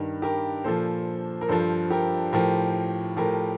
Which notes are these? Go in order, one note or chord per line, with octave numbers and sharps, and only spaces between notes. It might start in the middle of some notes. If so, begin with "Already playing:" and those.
Already playing: G2 D#3
G4 A#4
A#2 F3 A4 C5
A#4
G2 F3 A4 C5
G4 A#4
A2 F3 G4 A#4
A2 F3 G4 A#4